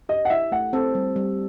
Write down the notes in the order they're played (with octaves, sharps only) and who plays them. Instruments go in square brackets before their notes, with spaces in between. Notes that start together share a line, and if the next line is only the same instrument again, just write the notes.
[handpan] G4 [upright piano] D#5
[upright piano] F#5
[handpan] E4 [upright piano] E5
[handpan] A3 [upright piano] F#5
[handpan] C4 [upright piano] A4
[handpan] G3
G3